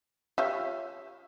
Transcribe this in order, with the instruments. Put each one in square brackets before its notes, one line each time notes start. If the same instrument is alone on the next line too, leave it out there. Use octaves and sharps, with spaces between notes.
[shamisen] F4 G4 C#5 [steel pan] E5